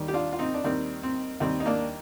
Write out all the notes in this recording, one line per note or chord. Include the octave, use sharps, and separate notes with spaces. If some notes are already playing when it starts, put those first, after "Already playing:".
Already playing: D#2 D#3 G3
G4
D4 F4
F4
C4 D#4
D4
D#2 D#3 G3 C4
C4
D#2 D#3 G3 C4
D#4
A#3 D4